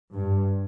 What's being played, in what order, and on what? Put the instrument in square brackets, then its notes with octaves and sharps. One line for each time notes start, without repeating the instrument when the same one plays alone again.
[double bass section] G2